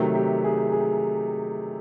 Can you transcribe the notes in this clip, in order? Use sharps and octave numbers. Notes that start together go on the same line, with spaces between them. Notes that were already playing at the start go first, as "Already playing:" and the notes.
Already playing: C3 D#3 F#3 A3
G4
G#4
G#4